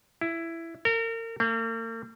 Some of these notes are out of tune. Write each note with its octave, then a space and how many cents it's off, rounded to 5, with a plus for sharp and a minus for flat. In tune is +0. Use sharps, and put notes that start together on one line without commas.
E4 +10
A#4 -35
A#3 -45